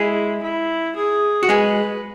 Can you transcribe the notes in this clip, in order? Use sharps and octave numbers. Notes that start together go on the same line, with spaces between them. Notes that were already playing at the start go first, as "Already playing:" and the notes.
Already playing: G#3 E4 G#4
E4
G#4
F#4
G#3 G#4 B4